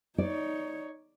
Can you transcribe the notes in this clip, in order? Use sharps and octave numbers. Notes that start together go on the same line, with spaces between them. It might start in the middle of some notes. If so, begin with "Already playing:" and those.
D#4 C#5 D5